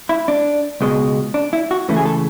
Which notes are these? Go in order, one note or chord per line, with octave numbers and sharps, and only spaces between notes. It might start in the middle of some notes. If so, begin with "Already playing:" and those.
E4
D4
C#2 B2 G#3
D4
E4
F#4
C#2 C#3 E3 A3
G#4
A4